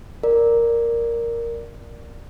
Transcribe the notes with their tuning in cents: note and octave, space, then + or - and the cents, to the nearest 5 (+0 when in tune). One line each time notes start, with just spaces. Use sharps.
A#4 +0 D5 +0